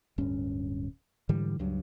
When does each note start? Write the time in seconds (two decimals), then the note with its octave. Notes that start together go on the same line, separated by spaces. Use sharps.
0.18 D1 G2 C#4
1.29 G#2 D3 E3 G3
1.59 C#2 G2 F#3